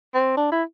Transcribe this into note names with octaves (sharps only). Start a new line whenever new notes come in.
C4
D4
E4